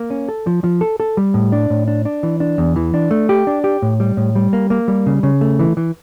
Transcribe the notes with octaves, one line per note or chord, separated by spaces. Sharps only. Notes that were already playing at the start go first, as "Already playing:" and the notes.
Already playing: A#3
C#4
A4
F3
F3
A4
A4
G3
A2
D4
A2
D4
D4
E3
D4
E2
E3
D4
A3
G4
D4
G4
A2
G3
A2
G3
A#3
A#3
G3
C#3
C#3
A3
E3
E3